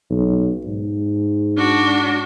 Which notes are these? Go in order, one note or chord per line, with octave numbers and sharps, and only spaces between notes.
B1
G#2
D4 F#4